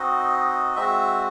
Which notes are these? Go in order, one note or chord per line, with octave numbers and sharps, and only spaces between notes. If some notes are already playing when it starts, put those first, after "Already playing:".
Already playing: C4 D#4 F#4 D#5
G#3 C4 F#4 E5